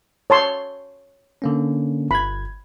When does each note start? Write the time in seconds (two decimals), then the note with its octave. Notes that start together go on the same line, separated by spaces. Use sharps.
0.30 C#5 A5 C6
1.42 D3 A#3 C#4
2.11 G1 B5 G#6